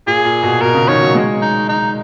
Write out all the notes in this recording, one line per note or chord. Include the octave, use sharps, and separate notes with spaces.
A#2 G#4
A#2
B2
B2 A#4
C#3
D#3 C#5
F#3
G#3
D#4
D#4